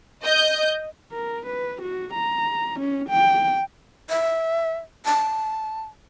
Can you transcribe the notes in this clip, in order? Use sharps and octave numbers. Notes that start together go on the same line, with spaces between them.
D#5 G6
A#4
B4
F#4
A#5
C#4
G5
E5
A5